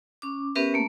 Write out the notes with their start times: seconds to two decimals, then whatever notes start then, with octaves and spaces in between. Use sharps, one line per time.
0.22 C#4 D6
0.55 B3 C#4 G4 A#4 B4 E5
0.74 A3 A#3